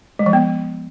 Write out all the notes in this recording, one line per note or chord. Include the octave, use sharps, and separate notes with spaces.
G#3
F3
B3